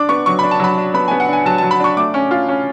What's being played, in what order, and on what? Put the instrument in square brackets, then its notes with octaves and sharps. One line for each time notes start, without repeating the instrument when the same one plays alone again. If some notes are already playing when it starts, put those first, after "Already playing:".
Already playing: [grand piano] D4 D6
B3 C#6
F#3 C#6
D4 B5
A5
F#3 B5
D4
B3 B5
B3 G#5
F#5
D4 G#5
F#3 A5
F#3 A5
B5
D4 C#6
A3 D6
C#4
F4
C#4